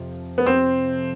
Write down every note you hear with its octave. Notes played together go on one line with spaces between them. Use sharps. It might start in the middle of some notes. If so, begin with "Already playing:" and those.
Already playing: F2 C3 F3
B3
C4